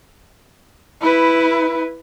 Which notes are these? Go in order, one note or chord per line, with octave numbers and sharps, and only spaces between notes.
E4 B4